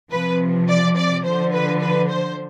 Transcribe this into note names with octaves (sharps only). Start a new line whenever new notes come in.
C3 F3 B4
D5
D5
D3 F3 C5
B4
B4
C5